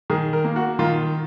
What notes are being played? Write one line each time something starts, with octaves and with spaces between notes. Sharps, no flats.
D#3 G#4
A#4
A#3
F#4
D#3 F4